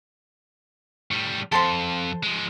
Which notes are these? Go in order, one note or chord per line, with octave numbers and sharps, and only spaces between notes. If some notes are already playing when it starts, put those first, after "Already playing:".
A2 G3
F2 A4 C5 C6
F3 G#3